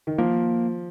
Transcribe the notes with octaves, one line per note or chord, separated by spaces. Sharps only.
D#3
F3 A#3